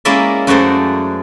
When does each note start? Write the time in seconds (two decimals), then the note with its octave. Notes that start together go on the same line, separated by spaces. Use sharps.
0.05 G#3 A#3 C#4 E4 D5 E5
0.47 F#2 A3 F#4 G#4 C5 D5